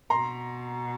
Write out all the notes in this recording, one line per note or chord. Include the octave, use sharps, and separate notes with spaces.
B2 A#5 C6